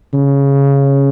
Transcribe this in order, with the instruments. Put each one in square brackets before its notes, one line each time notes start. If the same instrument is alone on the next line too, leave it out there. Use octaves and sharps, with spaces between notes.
[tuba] C#3